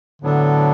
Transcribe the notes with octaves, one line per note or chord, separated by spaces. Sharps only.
A2 D3 F#3 B3 D4 A4